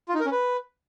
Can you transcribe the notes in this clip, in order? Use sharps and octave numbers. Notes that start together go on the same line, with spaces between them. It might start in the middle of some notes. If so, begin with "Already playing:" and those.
F4
D#4
A#4
C#4
B4